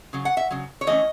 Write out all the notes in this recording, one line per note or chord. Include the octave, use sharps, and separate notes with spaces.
C#3 F#3
F#5
E5
C#3 F#3
C#5
E3 A3 C#4 D#5